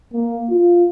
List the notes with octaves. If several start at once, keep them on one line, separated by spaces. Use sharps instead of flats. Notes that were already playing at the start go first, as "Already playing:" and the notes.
A#3
F4